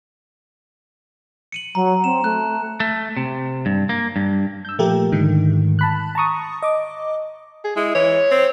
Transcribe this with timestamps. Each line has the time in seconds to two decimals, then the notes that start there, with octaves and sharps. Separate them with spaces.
1.52 C#7 D#7 F#7
1.75 F#3 A#5
2.04 C4 E7
2.24 A3 F#6
2.80 A3
3.17 C3
3.66 G2
3.89 A#3
4.16 G2
4.65 E6 G6
4.78 A#2 F3 A3 A#3 G4 A#4
5.12 G#2 D3 D#3 A3
5.79 A5 B5 F#6
6.15 A5 A#5 C#6 D#6
6.63 D#5 D6
7.64 G#4
7.76 G#3 E4
7.95 E3 C#5
8.31 C4